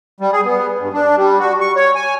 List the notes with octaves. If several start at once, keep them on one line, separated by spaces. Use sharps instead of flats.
G3
G#4
B3
G2
D4
G3
F#4
C#6
C#5
G#5